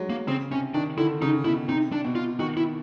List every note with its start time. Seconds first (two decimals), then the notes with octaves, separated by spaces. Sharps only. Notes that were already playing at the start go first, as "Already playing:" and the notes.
Already playing: F#3 G#3
0.10 A#3
0.27 C#3 C4
0.51 C3 C#4
0.74 D#3 D4
0.98 D3 E4
1.22 C#3 D#4
1.45 B2 E4
1.68 C3 D#4
1.92 D4
2.04 B2
2.15 F4
2.39 D#3 F#4
2.57 E4